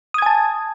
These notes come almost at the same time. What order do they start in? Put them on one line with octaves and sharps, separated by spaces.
D#6 G#6 G#5 A5